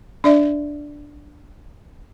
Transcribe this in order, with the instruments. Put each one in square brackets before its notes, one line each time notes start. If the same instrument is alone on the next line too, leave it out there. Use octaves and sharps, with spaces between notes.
[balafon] D4 D5 E5